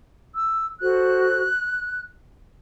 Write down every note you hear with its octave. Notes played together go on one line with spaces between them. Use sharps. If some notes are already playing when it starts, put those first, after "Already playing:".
E6
F#4 A4 C5 F#6